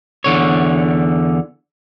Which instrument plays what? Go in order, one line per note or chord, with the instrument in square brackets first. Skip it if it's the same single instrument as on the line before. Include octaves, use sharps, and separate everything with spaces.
[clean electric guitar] E2 D3 C#5